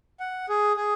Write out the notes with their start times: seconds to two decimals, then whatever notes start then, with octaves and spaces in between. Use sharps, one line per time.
0.20 F#5
0.49 G#4
0.77 G#4